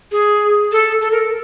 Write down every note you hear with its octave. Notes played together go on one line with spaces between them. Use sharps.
G#4
A4
A4
A#4